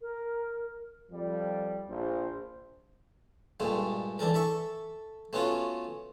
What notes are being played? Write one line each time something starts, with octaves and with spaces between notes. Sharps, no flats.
A#4
F2 F3 G3
A#1 C5
G2 A#2 G#3 A3
E3 D4 A4 A#4
A4 E5 C#6
A3 B3 C#4 F4 F#4